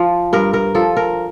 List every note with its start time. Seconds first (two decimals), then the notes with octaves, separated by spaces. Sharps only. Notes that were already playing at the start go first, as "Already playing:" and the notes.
Already playing: F3
0.33 G2 A#4
0.53 A#4
0.75 F3 A4
0.97 A#4